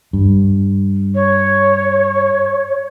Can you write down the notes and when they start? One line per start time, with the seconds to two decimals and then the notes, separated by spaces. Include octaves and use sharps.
0.13 G2
1.14 C#5